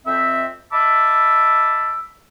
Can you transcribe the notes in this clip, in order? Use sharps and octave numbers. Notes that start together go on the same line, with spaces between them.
F2 C4 E5
D#5 E5 A5 B5 D6 E6